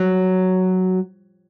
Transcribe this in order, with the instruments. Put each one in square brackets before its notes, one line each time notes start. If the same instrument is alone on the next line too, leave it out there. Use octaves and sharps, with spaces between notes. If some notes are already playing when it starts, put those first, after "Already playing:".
Already playing: [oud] F#3